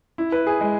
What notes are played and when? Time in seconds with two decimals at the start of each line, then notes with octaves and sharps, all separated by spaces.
0.18 E4
0.32 B4
0.47 G#4
0.61 G#3